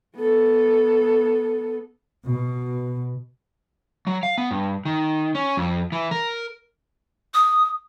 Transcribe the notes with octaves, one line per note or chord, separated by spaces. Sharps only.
B3 A4
B2
F#3
F5
B3
G2
D#3
C#4
F2
E3
A#4
D#6